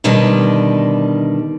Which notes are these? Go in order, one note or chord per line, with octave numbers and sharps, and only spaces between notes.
B2 D3 D#3 G3 D#5